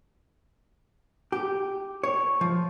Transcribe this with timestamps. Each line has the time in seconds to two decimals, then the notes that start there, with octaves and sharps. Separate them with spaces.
1.32 G4
2.03 C#5
2.41 F3